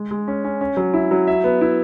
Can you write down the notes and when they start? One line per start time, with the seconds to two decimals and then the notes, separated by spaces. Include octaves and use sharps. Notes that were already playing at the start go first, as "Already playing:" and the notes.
Already playing: G#3
0.11 G#3
0.28 C#4
0.44 C#4
0.61 C#4
0.77 F#3
0.94 E4
1.11 F#3
1.27 E5
1.44 B3
1.61 E4